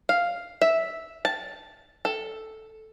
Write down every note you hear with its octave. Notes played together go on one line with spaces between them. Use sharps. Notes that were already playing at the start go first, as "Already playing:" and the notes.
F5
E5
A5
A4